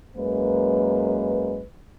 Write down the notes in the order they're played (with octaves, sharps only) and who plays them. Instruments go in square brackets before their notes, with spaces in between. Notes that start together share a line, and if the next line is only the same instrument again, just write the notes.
[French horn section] F#2 G#3 A#3 B4